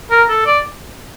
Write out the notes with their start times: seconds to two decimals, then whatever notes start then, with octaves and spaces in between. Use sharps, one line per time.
0.11 A#4
0.29 A4
0.46 D5